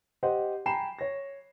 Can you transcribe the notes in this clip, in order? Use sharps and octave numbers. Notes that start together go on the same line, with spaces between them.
G4 C5 D#5 F#5
G5 G#5 A#5 B5 C7 E7
C#5 A#6